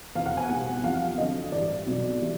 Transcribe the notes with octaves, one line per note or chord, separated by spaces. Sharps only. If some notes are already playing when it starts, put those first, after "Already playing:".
F1 E2 B2 F5
F#5
G#5
B1 B2 G3 F#5
E2 C3 F3 F5
F2 D3 F#3 D#5
A1 G2 E3 D5
B1 B2 F#3
E3 G3